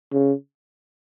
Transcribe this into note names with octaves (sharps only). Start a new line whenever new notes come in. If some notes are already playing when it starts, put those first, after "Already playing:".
C#3